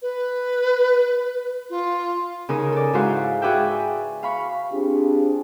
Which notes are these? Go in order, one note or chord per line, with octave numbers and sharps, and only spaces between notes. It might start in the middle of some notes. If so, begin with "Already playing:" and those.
B4
F4
C#3 D#4 A#4 D#6
A4 D5
G#2 E4 F#4 C5 F5
F#4 G#4 B4 D5 E5 G5
F5 B5 C#6
C4 D4 F4 G4 G#4